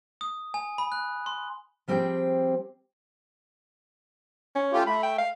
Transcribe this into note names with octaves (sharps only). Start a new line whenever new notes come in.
D#6
G#5
B5
F#6
C6
F3 G3 C4 G4 G#4 G5
C#4
A3 F4 G4
A3 B5
G5
F5